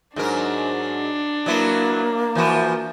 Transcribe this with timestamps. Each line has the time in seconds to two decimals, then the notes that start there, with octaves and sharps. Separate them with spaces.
0.16 G#2 F#3 D4 A#4
1.46 F#3 A#3 B3 E4
2.35 E3 F3 F#4